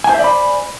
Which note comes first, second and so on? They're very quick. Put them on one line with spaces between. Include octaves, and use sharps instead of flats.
G#5 C5 E5 D5 B5